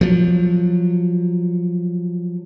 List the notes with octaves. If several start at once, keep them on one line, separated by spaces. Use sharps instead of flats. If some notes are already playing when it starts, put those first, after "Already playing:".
F3 F#3